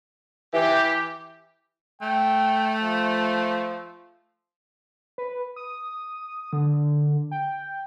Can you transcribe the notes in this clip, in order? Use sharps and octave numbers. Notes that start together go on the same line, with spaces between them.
E3 G4
A3 G5
F3
B4
D#6
D3
G5